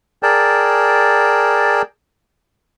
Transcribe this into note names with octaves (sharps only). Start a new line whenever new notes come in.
G#4 A#4 D5 G5 A5